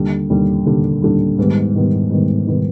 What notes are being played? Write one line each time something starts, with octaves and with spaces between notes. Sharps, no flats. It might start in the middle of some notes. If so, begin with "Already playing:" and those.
Already playing: D#2 D3 G3
D#2 D3 G3
D#2 D3 G3
D#2 D3 G3
G#2 D#3 G3 B3
G#2 D#3 G3 B3
G#2 D#3 G3 B3
G#2 D#3 G3 B3